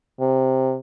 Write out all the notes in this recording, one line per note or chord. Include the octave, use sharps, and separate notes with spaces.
C3